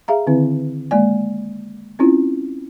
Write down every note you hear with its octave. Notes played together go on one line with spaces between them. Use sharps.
G#4 E5 F5 A#5
D3 D#3 C4 E4
G#3 A#3 D5 G#5
C4 C#4 E4 F4